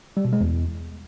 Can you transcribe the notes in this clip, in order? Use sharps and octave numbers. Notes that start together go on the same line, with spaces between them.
G3
B2
G#3
E2